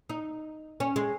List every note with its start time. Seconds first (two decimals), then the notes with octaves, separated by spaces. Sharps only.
0.09 D#4
0.80 C#4
0.96 G#3